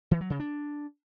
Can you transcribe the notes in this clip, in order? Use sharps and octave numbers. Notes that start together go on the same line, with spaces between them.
E3
F#3
C#3
D4